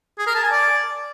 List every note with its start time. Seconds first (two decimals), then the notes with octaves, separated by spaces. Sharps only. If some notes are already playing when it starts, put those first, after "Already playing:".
0.19 G#4
0.27 A#4
0.35 A5
0.43 G#5
0.52 D5